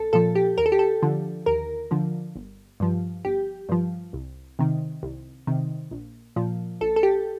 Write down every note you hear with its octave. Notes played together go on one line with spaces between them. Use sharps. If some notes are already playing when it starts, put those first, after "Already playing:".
Already playing: A#1 A4
A#2 F3 A4
G4
D#2 A#4
A4
G4
A4
D3 F3
D#2 A#4
D3 F3
G1
G2 F3
G1 G4
G2 F3
C2
C3 D#3
C2
C3 D#3
A#1
A#2 F3
A#1 A4
A4
G4